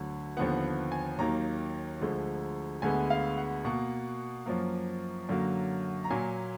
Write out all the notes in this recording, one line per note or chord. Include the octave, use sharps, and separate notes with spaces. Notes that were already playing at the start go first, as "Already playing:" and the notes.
Already playing: D2 D3 F#3
D#2 D3 F3 B3 F#5
G#5
D#2 D#3 F#3 A#3 A#5
D2 D3 F3 G#3
D2 D3 G#3 B3 G#5
F5
F#5
B2 A#3 F#5
F#2 F3 A#3
F#2 D3 F#3 A#3
A#5
A#2 F#3 A#3 G#5